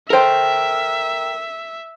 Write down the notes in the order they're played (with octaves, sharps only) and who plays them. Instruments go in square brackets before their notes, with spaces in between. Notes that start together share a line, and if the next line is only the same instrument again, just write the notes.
[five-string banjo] A4 C5 [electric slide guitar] A#4 G5 [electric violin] E5